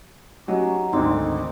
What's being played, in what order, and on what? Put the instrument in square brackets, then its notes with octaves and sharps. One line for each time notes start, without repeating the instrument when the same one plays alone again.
[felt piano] F#3 [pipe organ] C#4 F#4 G4 [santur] D#4 F#5
[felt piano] G#1 D2 [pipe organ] D3 D#3 D6 [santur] C4 [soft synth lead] D#4